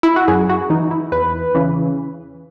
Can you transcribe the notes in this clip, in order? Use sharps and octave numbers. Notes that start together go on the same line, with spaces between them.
E4
F#4
F#2 G#4
F#4
E3 D#4
E4
E2 B4
C#3 E3